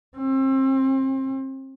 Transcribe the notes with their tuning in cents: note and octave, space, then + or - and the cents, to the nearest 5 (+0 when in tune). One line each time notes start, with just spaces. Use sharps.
C4 +35